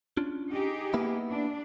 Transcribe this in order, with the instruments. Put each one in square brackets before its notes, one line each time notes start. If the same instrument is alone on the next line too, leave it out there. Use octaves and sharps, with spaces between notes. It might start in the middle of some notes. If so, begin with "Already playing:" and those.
[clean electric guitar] C#4 D4 F4
[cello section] D#4 G4 G#4
[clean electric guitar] A#3 B3 E4
[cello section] D4